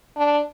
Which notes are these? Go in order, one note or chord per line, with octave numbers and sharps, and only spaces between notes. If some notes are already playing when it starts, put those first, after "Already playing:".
D4